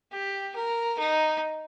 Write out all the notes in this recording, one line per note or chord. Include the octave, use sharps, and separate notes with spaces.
G4
A#4
D#4